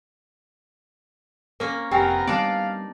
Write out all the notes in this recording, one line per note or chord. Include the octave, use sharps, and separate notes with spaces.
A#3 C#4 A#4
F1 B3 C4 G4 A#4 G5 G#5
G3 A3 B3 D4 D#4 D5 F5